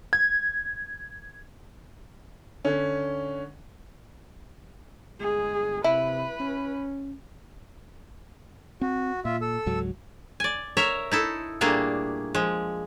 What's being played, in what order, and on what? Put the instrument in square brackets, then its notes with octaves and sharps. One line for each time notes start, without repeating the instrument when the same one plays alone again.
[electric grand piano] G#6
[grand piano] D3 C#4
[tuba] G1 [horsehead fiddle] G#3 G#4
[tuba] C3 [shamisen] E4 [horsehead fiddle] B4
[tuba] C#4
[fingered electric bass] C4 [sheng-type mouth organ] F#4
[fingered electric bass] A#2 [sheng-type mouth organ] F4 E5
[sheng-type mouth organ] A4 E6
[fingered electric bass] C#2 G#2 F#3
[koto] D5 G#5
A#4 C#5 E5 A#5
D#4 E4 A4
A#2 G3 A3 A#3 D4 G#4
F3 G#3